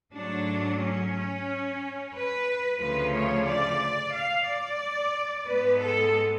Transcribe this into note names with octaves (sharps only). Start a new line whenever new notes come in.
G#2 F#3 A3 D4
C#4
B4
D2 C#3 F3 A3 B4
C#5
D5
F5
D5
G#2 G#3 B3 B4
A4